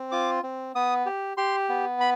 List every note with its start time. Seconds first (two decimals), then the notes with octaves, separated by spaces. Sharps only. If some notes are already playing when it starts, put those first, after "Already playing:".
Already playing: C4
0.11 F4 D6
0.43 C4
0.75 B3 D#6
1.06 G4
1.37 G4 C6
1.69 B3
2.00 B5